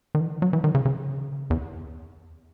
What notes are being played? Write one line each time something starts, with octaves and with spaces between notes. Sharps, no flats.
D#3
E3
F#3
E3
D#3
C#3
C#3
E2